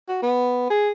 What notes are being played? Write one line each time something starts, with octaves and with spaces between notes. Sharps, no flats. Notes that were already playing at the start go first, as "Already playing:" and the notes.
F#4
B3
G#4